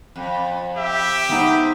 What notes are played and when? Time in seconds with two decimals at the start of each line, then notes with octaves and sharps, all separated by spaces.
0.16 F2
0.77 G4 E5
1.29 G#2 B3 D#4